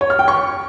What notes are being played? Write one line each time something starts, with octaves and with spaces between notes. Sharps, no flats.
C#5
F6
G5
C#6